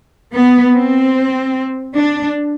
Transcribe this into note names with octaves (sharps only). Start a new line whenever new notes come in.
B3
C4
D4